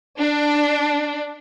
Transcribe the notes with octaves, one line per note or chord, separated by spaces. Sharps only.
D4